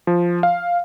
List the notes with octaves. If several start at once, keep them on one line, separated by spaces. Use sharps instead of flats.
F3
F5